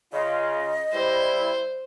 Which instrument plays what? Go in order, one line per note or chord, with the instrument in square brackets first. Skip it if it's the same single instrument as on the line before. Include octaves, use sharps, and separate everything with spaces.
[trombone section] C#3 F4 [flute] D#5
[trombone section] G3 E4 [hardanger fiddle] C5